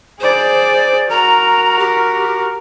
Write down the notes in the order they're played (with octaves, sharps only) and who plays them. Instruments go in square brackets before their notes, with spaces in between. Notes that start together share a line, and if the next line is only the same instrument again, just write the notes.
[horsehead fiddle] G#4 D5 [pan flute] C5
[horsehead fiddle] F#4 A#4 [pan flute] A#5
[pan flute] G4